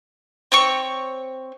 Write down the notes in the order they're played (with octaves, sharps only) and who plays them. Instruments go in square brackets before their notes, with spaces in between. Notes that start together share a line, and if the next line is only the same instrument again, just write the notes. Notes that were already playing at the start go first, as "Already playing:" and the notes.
[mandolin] C4 C#5 C#6